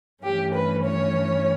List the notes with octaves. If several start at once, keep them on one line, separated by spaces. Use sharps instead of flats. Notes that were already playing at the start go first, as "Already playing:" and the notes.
G2 E3 A3 C#4 G4
B4
C#5